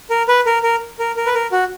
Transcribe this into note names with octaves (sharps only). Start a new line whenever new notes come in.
A#4
B4
A#4
A#4
A#4
A#4
B4
A#4
F#4